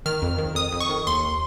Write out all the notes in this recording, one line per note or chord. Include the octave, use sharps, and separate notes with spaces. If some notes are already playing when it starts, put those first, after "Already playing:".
D#3 F6
F2
D#3
F2 D#6
F2
C#6
D#3
D#2 C6